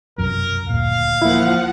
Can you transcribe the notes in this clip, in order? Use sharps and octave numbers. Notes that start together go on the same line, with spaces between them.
B1 F#2 C3 F3 A#4
D#1 D2 A#2 F5
F3 A#3 E4 F#5